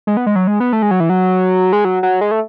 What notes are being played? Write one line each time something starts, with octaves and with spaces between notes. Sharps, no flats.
G#3
B3
G#3
F#3
G#3
B3
A3
G#3
F#3
E3
F#3
G#3
F#3
F#3
G#3
A3